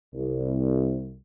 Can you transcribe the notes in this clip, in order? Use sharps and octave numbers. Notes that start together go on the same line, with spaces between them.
C2